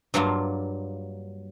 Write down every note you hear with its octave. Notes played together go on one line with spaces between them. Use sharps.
G2 F#3 A#3 F4